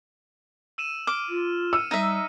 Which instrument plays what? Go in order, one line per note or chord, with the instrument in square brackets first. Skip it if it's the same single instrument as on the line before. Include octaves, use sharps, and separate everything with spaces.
[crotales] E6 D#7 E7
[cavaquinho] D6 [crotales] F6
[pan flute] F4
[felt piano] E6 [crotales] C#7 D#7
[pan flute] G3 [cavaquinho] D#4 E5